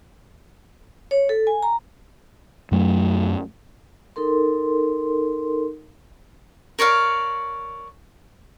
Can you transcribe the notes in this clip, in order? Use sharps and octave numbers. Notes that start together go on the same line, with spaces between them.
C#5
A4
G#5
A#5
F#2 F#3 A3
D#4 A4 A#4 C6
A#4 C#5 D5 F5